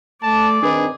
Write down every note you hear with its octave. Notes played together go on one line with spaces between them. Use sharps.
A3 D5 A5
D#3 C4 D4 G#4 B4